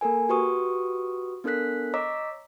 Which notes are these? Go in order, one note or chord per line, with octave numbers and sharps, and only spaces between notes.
A#3 A4 A#4 G#5
F#4 G4 B4 C#6 D#6
B3 D4 A4 A#4 F#6 B6
C#5 D#5 A#5 D6 E6 B6